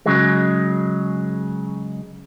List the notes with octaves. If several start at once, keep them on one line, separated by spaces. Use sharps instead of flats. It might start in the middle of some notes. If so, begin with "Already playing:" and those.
C#3 F#3 G#3